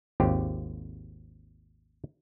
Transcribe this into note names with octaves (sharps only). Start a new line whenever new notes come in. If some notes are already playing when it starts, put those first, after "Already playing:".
G#1 D#2 C4 F4 G4